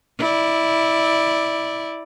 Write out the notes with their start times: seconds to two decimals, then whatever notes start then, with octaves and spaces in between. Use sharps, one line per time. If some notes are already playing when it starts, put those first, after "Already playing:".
0.19 E4 D5